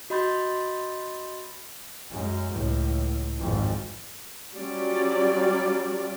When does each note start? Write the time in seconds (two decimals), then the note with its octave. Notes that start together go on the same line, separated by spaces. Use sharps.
0.10 F#4 D#5 B5 C6 G6 A6
2.10 F#2 G#3
2.51 C#2 A2
3.39 G#1 F2
4.58 F#3 G3 C#4 F4 D5